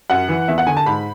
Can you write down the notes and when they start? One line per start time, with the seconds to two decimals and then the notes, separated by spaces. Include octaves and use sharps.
0.10 F#2 F#5
0.29 E3
0.48 E2 E5
0.58 F#5
0.67 D3 G#5
0.77 A5
0.86 G#2 B5